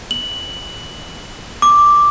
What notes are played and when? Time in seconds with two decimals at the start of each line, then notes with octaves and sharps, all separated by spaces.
0.11 F#7
1.62 D6